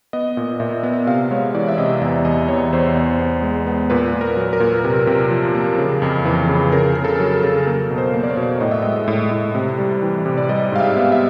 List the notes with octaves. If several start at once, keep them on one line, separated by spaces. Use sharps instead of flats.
B3 D#5
A#2
A#2 E5
B3
C3 F5
G#3 C#5
E3 D5
E5
C3 D#5
E2 E5
E2 D#5
E2 C#5
E2 C5
B3
B3
G#3
B3
A#2 B4
A#2
A#4
F#3
A#4
A#2
C3
C3
F3
A#3
C#3
F2
E3
C#3
C#3 A#4
C#3
A4
F#3
A4
C#3
A#3 A#4
B2
C5
A#3
D5
C#5
B2
A2 D#5
E5
G#3 D#5
A2
A2
C3
G3
E3
C3
D5
G3 D#5
G#2 F5
E5
B3
E5